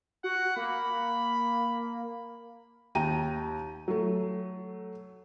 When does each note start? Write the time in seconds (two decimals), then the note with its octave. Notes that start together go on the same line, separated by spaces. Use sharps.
0.24 F#4 F#5
0.57 A#3 B5
2.95 D#2 G5 A#5 D#7
3.88 F#3 A3